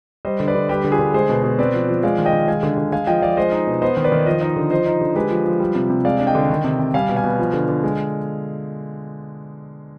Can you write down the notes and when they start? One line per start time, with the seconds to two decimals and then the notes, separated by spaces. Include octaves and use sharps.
0.25 G3 C5 D#5
0.40 D3
0.48 B4 D5
0.55 D3
0.69 G3 G4 B4
0.84 D3
0.91 F4 G#4
0.99 D3
1.14 G#3 G#4 C5
1.29 B2
1.44 B2
1.59 C4 B4 D5
1.74 F3
1.88 F3
2.03 G#3 D5 F5
2.18 D#3
2.25 D#5 G5
2.33 D#3
2.48 G#3 F5 G#5
2.63 D3
2.78 D3
2.92 G#3 F5 G#5
3.07 F3 D#5 G5
3.22 F3 D5 F5
3.37 G#3 C5 D#5
3.52 D#4
3.67 B2
3.82 B3 C5 D#5
3.97 D#3
4.04 B4 D5
4.12 D#3
4.26 F3 C5 D#5
4.41 D#4
4.56 D3
4.71 F3 C5 D#5
4.86 D#4
5.01 D3
5.15 G#3 G4 B4
5.31 F3
5.45 F3
5.60 G3
5.75 C3
5.90 C3
6.05 G#3 D5 F5
6.20 D4
6.27 D#5 G5
6.35 D3
6.50 D#3
6.64 C3
6.79 C3
6.94 G3 F5 G#5
7.09 B2
7.16 F5 G#5
7.24 B2
7.39 F3
7.54 D3
7.69 D3
7.83 G#3